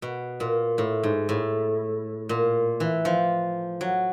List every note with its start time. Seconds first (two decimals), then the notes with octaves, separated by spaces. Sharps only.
0.02 B2
0.40 A#2
0.78 A2
1.03 G#2
1.29 A2
2.29 A#2
2.80 E3
3.05 F3
3.81 F#3